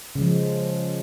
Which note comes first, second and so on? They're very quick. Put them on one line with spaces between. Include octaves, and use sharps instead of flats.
C#3 G#3 F3